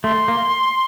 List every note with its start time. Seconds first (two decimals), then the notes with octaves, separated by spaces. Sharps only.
0.04 A3 C6
0.28 A#3